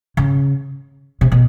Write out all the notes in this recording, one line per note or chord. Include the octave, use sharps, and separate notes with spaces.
C#3
C3
B2